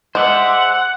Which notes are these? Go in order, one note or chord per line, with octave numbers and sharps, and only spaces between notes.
G#3 C5 D5 E5 F#5